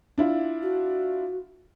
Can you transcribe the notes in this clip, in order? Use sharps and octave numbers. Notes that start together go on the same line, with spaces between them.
D4 E4 F4
F#4